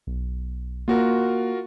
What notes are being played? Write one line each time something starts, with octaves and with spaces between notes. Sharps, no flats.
B1
A#3 F4 F#4 A#4